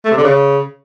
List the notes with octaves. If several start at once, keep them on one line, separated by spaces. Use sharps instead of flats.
A3
C3
D3
C#3